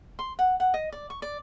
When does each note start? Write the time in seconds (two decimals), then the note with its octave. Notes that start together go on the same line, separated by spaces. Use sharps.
0.19 C6
0.39 F#5
0.60 F#5
0.74 D#5
0.92 D5
1.10 C#6
1.22 D5